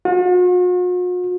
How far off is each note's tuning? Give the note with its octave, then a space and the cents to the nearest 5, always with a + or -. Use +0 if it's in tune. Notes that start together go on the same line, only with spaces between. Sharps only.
F#4 -45